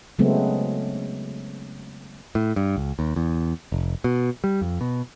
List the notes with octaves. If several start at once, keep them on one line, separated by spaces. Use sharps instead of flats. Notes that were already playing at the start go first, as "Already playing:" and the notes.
C#3 F#3 G#3 A3 B3 C4
A2
G2
C#2
D#2
E2
F1
B2
G3
F2
B2